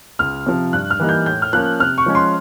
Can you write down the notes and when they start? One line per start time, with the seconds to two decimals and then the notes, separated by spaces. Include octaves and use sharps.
0.19 C#2 F6
0.46 C3 F3
0.73 G2 F#6
0.90 F6
1.00 E3 G3 A#3 D#4
1.09 G6
1.26 A2 G6
1.42 F6
1.53 F3 A#3 C#4 F#6
1.80 C3 F6
1.98 C#6
2.06 F3 G#3 C#4
2.15 C6